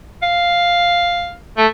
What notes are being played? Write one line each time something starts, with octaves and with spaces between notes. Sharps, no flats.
F5
A3